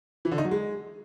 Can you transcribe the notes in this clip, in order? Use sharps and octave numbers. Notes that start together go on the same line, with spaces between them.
E3
D3
D#4
F#3
G#3